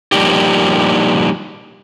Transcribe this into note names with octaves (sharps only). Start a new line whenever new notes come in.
F3 G3 A#3 D4 D#4 G4